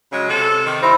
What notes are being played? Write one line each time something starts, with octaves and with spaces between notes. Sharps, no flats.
C#3 F#3 G#3
C3 A4
C3 D#3
G3 C4 D#4 E4 C5